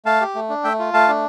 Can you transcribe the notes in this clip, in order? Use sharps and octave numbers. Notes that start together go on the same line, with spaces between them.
A3 F5 A5
G4
A3
D4
A3 E5 G5
F4
A3 F5 A5
D4